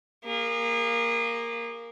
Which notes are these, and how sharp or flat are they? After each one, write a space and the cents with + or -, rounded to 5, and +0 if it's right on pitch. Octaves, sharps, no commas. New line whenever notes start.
A#3 +0 G#4 -35